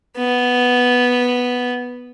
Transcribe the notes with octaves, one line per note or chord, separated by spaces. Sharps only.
B3